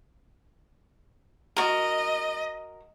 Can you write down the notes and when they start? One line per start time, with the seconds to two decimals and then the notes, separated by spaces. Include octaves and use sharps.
1.56 F#4 A#4 D#5